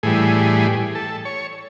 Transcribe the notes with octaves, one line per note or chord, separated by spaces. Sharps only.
A2 E3 G3 G#4
A4
C#5